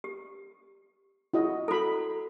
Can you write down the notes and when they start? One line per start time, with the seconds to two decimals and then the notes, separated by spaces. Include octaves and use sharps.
0.04 G4
1.33 E4 F#4 D#5
1.68 F#4 A4 A#5 B5